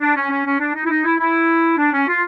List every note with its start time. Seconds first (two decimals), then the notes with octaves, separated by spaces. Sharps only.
0.01 D4
0.16 C#4
0.31 C#4
0.45 C#4
0.60 D4
0.74 D#4
0.85 E4
0.89 D#4
1.04 E4
1.19 E4
1.78 D4
1.93 C#4
2.07 F4